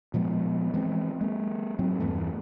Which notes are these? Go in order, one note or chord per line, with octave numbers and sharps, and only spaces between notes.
A#2 F3 G#3 B3
E3 G#3 B3 C4
G#3 A#3
G#2 F#3 C4
E2 G2 E3 A3